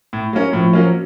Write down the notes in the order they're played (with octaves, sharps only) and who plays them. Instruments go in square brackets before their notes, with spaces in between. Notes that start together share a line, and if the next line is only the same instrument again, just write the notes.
[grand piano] A2
F#3 A#3 C#4
[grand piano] A2 [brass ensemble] F3
[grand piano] F#3 A#3 C#4